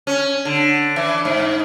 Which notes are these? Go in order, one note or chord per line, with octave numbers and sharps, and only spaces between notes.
C#4
D3
E3
G#2